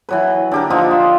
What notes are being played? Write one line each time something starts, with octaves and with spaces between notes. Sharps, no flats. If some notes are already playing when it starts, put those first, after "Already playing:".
E3 F#3 B4
D3 G4 A#4
D3 F3 D#4 F4
C5